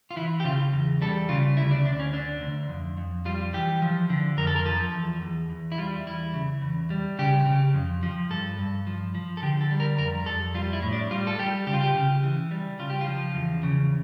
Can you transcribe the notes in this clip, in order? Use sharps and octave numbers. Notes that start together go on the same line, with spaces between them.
F4
E3 E4
G4
C#3 F4
E2
G3 A4
C#3 F4
D2 E4
D4
D2 D4
C#4
D3 D4
D2
F2
F2
G3 F4
E3 G4
F3
D3
F2 A#4
A4
A#4
F3 A4
E2
E2
E2
E4
G3 F4
E2 E4
C#3
E2
G3
C#3 G4
C#3
F2
F3
G2 A4
G2
F3
F3
A4
D3 G4
A4
G3
A#4
F2 A#4
F2 A4
G3 F4
E4
A2
D4
G3 F4
A4
G3 G4
C#3 G4
F4
G4
C#3
E3
G3
C#3 F4
G4
F4
F3
E2
C#3